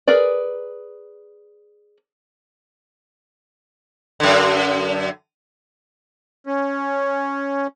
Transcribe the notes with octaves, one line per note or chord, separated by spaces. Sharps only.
G#4 A#4 B4 D5
F#2 D3
C#4